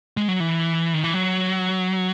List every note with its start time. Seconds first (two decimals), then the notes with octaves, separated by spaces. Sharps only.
0.17 G#3
0.28 F#3
0.40 E3
0.94 D#3
1.04 E3
1.14 F#3